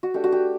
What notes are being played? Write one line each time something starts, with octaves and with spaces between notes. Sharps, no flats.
F#4
A3 D4 G4
F#4
G4